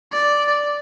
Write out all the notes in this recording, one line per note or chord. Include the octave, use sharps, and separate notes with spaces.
D5